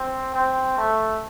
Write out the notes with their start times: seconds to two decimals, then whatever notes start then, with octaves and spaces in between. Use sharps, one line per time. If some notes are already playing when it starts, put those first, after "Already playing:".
Already playing: C4
0.34 C4
0.78 A3